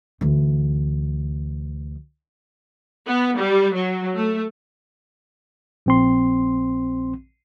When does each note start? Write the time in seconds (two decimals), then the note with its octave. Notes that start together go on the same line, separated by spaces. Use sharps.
0.21 D2 E3
3.06 B3
3.37 G3
3.74 F#3
4.17 A3
5.86 A#1 C4 C6